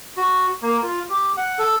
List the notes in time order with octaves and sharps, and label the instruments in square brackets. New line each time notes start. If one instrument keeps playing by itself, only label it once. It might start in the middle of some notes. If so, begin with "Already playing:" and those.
[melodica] F#4
A#3
F4
G4
F#5
A4